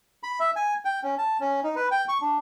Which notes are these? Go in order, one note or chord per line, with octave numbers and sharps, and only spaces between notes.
B5
E5
G#5
G5
C#4
A5
C#4
D#4
B4
G5
C#6
D4